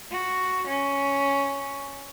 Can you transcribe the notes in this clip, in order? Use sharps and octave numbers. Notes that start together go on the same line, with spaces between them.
F#4
C#4